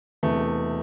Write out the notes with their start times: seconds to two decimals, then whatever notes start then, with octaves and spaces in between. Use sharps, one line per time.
0.23 E1 E2 C3 E3 A3